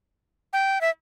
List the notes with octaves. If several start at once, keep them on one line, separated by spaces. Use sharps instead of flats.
G5
E5